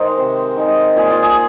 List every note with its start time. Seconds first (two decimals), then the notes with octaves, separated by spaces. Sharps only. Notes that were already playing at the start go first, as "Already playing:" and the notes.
Already playing: D#3 G#3 A#4 C5
0.18 C3
0.57 D#3 G#3
0.97 A#2 G#4
1.10 F4
1.23 G#4